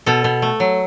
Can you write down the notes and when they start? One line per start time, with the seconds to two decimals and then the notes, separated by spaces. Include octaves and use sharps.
0.06 B2 A4
0.24 B2
0.42 A3
0.60 F#3